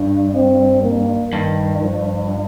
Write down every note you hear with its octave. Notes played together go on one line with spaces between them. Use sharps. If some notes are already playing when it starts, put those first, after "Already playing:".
Already playing: G2 D4
C4
A#3
G2 D#3
F3